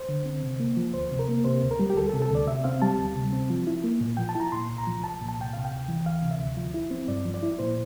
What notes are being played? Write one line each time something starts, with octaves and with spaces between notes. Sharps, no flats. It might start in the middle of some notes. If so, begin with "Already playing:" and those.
Already playing: C5
D3
C4
C3
A#3
F3
D2 C5
C3
A#4
A#3
C3 C5
D2
A#4
G3
G4
D2 A4
A4
C3
A4
D2 D5
C3 E5
C4 F5
G3 A5
D2
C3
C4
F3
E4
A#3
A#2
F3 G5
A5
E4
A#5
A#2 C6
C2
A#5
F3
C2 A5
A#2
A5
C2 G5
C3 F5
G5
D2
E3
D2 F5
C3
E5
D2
F3
E4
C4
G2 D5
F3
D5
E4
A#2 C5